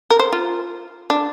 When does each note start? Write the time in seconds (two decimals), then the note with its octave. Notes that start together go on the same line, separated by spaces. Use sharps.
0.10 A#4
0.19 C5
0.33 F4
1.10 D4